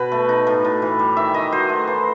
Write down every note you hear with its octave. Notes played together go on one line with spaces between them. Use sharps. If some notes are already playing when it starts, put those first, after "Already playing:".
Already playing: B2 B4
A3
D#4
A2
A2
E3
G3
D#3 E5
D#3 D#5
F#3 C5
A3
E3